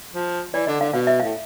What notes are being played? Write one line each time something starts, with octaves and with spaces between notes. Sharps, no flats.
F3
E3 D5
D3 D#5
D3 F5
B2 F5
E5
A2 F5